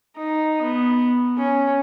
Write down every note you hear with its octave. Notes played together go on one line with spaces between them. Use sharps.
D#4
B3
C#4